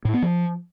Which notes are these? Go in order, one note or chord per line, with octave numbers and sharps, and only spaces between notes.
A2
B3
F3